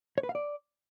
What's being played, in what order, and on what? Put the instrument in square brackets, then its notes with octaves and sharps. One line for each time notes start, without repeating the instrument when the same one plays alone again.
[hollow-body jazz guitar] C#5
B4
F5
D5